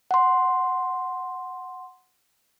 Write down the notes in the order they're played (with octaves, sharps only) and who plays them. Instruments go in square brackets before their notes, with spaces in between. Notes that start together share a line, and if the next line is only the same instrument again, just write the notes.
[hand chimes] F#5 C6